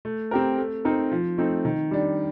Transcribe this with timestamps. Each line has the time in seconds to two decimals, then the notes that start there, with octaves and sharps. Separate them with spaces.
0.05 A3
0.31 C4 G4 A#4
0.58 A3
0.85 C4 D#4 A#4
1.12 F3
1.38 A3 C4 D#4
1.65 D#3
1.91 G3 D4